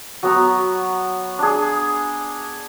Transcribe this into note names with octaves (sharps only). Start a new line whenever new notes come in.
F#3 B3 A#5 C#6
D4 G#4